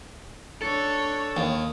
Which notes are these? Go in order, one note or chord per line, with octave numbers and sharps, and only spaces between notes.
D4 A4 C#5
D#2